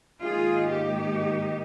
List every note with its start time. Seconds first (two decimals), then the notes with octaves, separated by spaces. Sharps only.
0.21 G#2 D#3 A#3 D#4 F4 G#4
0.67 G4